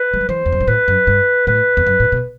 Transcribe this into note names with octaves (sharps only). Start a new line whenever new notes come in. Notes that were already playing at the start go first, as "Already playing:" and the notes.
Already playing: B4
G3
F#3
E3 C5
E2
F#2
G2
A2 B4
F#2
G2
A2 B4
E2
F#2
A2
B2